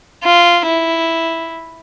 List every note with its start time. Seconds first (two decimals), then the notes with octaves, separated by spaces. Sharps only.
0.24 F4
0.66 E4